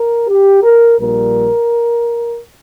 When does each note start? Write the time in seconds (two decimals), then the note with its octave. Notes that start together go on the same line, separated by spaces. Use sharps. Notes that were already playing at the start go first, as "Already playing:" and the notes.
Already playing: A#4
0.28 G4
0.63 A#4
0.99 A#1 A#2 G3 A#4